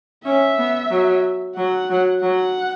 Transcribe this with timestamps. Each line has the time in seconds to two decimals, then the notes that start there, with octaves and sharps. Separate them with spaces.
0.25 C#4 E5
0.58 B3
0.91 F#3
1.57 F#3 F#5
1.90 F#3
2.22 F#3 F#5